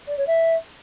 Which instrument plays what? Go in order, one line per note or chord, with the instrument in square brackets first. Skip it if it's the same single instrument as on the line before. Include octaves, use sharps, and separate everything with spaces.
[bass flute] D5
C#5
E5